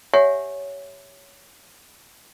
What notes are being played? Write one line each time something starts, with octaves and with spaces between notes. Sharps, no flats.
G4 C#5 E5 F#5 G#5